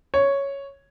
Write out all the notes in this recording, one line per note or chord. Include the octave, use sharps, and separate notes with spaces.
C#5